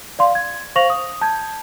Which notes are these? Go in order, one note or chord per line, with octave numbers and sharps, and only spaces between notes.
D5 F5 C6
G#6
C5 F5 C#6 A#6 F7 F#7
D#6
A5 G6 G#6